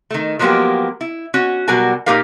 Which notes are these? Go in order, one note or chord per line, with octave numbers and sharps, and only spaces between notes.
D#3 A3
F3 F#3 G#3 A#3 B3 G4
E4
C#4 F#4
B2 F#3 G3 F#4 A#4 G#5
A#2 A#3 D#4 G4 A#4 F5